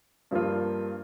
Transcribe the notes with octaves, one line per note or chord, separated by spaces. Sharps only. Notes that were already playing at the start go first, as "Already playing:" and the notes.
G2 F3 A#3 F4